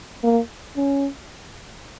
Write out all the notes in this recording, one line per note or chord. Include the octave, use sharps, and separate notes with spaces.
A#3
C#4